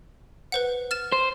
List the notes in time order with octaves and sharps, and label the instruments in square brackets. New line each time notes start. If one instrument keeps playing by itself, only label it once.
[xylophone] B4 C5 F#5
F6 A6 E7
[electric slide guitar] C5